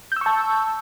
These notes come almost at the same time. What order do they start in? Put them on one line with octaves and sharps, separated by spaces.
G6 E6 C#6 A5